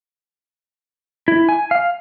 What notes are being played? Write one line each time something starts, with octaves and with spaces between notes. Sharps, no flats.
E4
G#5
F5